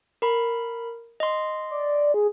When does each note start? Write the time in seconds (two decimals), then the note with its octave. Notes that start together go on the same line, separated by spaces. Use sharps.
0.22 A#4 B5
1.20 D#5 C6
1.71 D5
2.14 G#4